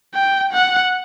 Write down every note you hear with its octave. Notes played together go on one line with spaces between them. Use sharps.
G5
F#5